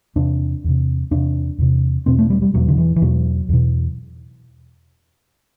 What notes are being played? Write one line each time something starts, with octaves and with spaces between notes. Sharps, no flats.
E2 C3 D4
E2 C3
E2 C3 D4
E2 C3
E2 B2 C4
A3
G3
G3
E2 B2 F#3
D3
E3
E3
E2 B2 F#3
E2 B2